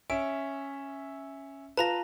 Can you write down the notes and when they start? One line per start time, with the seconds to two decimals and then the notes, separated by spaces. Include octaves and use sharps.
0.10 C#4 E5 D7
1.77 F4 B4 A5 A#5 A#6